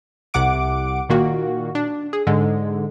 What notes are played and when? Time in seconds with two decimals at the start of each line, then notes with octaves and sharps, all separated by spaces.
0.34 C2 C3 F#5 D6 D7
1.09 A#2 D#3 A#3 F#4
1.75 D4
2.13 G#4
2.27 G#2 D3 G#3